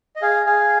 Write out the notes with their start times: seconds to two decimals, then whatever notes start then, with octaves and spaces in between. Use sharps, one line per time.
0.16 D#5
0.22 G#4 F5
0.46 G#4 F5